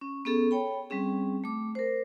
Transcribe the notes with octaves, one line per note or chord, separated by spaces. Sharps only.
C#4
B3 C#4 G#4 A4
C#5 G5 B5
G3 C4 C#4 G#4
A3 D6
A#4 C5